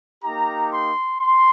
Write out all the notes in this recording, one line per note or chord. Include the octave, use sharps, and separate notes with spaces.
A#3 D#4 G4 A#5
C6
C6